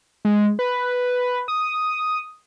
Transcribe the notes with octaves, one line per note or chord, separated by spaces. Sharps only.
G#3
B4
D#6